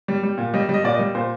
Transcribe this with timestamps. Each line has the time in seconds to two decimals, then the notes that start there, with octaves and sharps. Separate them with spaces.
0.08 G3
0.23 G3
0.38 A#2
0.54 G3 D#5
0.69 G3 D#5
0.84 A#2 D5
0.94 G3 D#5
1.15 A#2 C5